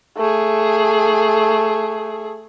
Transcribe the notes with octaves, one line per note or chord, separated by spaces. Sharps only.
A3 G#4